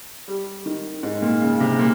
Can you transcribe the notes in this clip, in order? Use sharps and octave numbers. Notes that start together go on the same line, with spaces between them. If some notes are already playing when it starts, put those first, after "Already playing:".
G3
D#3
G#2
A#2
C#3
C3
A#2